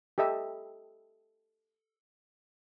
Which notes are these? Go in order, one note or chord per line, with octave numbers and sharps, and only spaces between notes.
G4 A4 D#5 E5